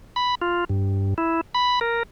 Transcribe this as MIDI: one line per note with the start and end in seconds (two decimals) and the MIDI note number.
0.16 0.35 83
0.42 0.64 65
0.70 1.14 43
1.18 1.41 64
1.55 1.79 83
1.81 2.03 70